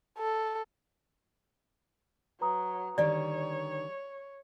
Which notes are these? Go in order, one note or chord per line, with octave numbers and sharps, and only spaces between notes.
A4
F#3 B4 A#5 D#6
D3 D#3 G3 C#5 D5